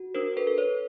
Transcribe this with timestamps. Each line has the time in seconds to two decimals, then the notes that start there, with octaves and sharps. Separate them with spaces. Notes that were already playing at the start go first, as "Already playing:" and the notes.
Already playing: F#4
0.14 D4 A#4 C5
0.37 A4 B4
0.47 A4
0.58 B4 C#5